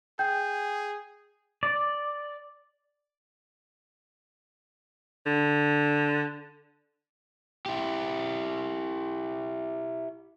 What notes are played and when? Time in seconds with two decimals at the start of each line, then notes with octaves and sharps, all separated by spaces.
0.19 G#4 G5 G6
1.63 D5
5.26 D3
7.66 E4 G4